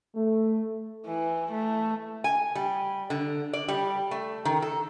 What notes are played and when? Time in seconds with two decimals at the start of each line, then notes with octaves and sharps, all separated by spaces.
0.15 A3
1.06 E3
1.52 A3
2.24 G#5
2.55 G3
3.10 D3
3.53 D5
3.68 G3
4.11 A3
4.45 D#3
4.62 A4